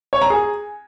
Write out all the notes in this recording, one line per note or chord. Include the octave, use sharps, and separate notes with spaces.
C#5
A#5
G#4